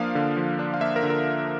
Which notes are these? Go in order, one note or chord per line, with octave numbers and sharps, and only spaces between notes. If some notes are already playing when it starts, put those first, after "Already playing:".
Already playing: F3 A#3 D4 F5
D3
F3
D4
F5
A#3 E5
A#4
D3
A#4